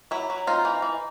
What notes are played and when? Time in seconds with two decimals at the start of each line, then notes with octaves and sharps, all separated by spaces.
0.11 F#3 E4
0.30 F#3
0.47 C4 D#4 F4
0.65 E3
0.82 E3